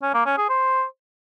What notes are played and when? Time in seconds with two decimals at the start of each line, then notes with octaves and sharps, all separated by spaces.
0.02 C#4
0.14 A#3
0.26 C#4
0.38 G#4
0.49 C5